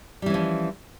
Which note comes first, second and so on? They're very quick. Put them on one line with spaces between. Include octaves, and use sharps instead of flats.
G3 E3 C#4 F3